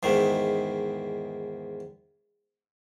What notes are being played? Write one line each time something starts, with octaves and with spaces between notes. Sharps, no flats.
E2 G#2 D#3